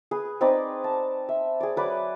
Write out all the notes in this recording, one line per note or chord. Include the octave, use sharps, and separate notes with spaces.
G#4 B4
C4 D#4 B4 D5
A5
E5
G#4 D5
F#3 B4 D5 D6